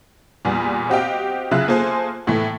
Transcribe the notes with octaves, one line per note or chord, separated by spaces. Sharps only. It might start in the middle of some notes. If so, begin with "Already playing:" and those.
E2 A#2 G3 B3
C4 F#4 G4 D#5 F5 G5
C#3 F#3 F4 E5 F#6
A#3 F4 G#4 A4 C5 G#5
A2 E3 A3